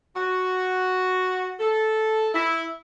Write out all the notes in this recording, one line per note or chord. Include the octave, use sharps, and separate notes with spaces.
F#4
A4
E4